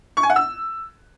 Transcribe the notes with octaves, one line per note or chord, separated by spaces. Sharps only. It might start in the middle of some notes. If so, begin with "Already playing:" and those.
C#6
G#5
F#5
E6